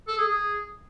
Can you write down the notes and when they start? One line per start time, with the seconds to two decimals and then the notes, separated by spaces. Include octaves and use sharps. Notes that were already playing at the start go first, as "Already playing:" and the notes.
0.08 A4
0.18 G#4
0.29 G#4